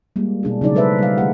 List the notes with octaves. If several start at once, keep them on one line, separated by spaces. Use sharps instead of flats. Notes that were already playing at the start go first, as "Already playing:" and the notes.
G3 G#3 A#3
B2 D4 E4 G#4
C#3 F#3 D#4 D5
G3 G#3 A4 B4 C5 E5
G3 F5
D#3 A3 G4 F#5